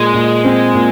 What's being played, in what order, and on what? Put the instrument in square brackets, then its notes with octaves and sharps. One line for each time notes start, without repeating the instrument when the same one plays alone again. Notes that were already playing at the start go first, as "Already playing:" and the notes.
Already playing: [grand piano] A#2 [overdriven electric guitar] G#3
[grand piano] A#2
C4
A#2